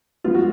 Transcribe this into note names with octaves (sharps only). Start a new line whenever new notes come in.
F3 G#3 B3 F4
F#4